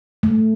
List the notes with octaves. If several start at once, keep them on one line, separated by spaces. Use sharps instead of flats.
A3